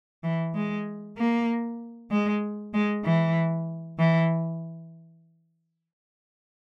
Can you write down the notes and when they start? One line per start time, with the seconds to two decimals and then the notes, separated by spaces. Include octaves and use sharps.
0.24 E3
0.55 G#3
1.17 A#3
2.11 G#3
2.74 G#3
3.05 E3
3.99 E3